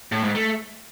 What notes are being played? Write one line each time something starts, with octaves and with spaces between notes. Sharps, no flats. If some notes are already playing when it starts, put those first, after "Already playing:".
A2
G#2
A3